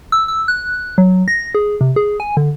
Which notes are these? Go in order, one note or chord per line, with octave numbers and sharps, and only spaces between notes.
E6
E6
F#6
F#3
A#6
G#4
C3
G#4
G#5
D3